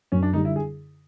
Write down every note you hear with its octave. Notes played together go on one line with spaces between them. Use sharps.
F#2 C#4
D4
D3 G3 D#4
E4
G#4